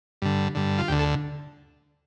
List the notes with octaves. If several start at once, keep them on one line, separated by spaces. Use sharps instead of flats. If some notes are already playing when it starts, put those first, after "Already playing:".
G2 D3
G2 D3
F4
D2 D3 G4
A4